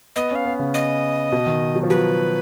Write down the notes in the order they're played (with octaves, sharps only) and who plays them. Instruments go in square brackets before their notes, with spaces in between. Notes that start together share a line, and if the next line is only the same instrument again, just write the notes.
[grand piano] B3 [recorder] D#5
[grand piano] C#4 [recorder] F5
[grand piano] B3
C#3
[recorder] D#5
[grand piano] B2
D#3
F#3
F3
[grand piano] F#3 [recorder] B4